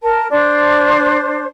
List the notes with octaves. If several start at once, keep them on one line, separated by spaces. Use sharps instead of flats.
A#4 A5
D4 C5